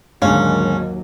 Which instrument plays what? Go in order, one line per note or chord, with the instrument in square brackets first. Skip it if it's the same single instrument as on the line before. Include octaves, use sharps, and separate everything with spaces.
[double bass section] D#2 F#3 [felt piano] G#2 D3 [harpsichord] C#4 [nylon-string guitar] F5